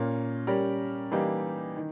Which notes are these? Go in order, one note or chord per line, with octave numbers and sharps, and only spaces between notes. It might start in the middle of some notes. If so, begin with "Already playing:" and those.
Already playing: A#2 A#3 C#4
G3 C#4 G4 A#4
E3 G3 A#3 D#4 G4
D#3